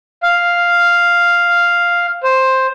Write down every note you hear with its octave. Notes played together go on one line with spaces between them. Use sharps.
F5
C5